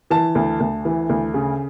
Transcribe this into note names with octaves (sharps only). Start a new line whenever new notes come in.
E3 A5
D2
D2
E3
D2
C#3